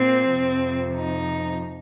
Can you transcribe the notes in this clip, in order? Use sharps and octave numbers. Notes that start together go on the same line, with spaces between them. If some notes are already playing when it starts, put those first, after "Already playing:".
Already playing: A#2 A#3 C4
F2 C3 F3
D#4